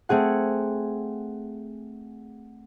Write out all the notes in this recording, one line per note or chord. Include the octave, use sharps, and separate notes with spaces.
A3 C4 G#4 F#5